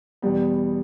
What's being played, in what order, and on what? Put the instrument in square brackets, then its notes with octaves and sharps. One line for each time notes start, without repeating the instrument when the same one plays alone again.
[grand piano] E2 B2 G3 B3